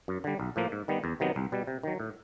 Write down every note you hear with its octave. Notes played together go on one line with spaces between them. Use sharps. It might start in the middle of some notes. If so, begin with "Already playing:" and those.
F#2
D3 G3
B1
A2 F3 A#3
G#2
D#3 G3 B3
E2
C3 D#3 F#3 B3
C2
B2 G3
C3
D#3 F#3
A2